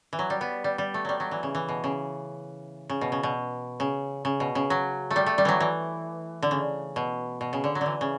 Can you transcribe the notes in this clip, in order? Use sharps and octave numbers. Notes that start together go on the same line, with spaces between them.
E3
F#3
G3
B3
G3
G3
A3
F#3 G3
F#3
E3
C#3
E3
B2
C#3
C#3
B2
C#3
B2
C#3
C#3
B2
C#3
F#3
A3
G3
A3
G3
E3 F#3
E3
D3
C#3
B2
B2
C#3
D3
F#3
D3 E3
C#3